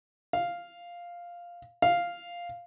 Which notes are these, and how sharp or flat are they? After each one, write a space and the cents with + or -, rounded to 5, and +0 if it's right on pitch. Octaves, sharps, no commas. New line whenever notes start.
F5 +0
F5 +0